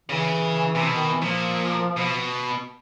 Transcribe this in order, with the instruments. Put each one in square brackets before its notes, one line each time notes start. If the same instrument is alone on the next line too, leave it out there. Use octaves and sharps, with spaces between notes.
[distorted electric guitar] C#3 [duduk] E3
[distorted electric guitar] C3
B2
[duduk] D#3
E3
[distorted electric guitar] A#2 [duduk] F3
[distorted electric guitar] B2